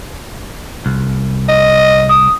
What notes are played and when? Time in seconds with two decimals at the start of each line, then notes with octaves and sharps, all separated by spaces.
0.86 C2
1.49 D#5
2.09 D#6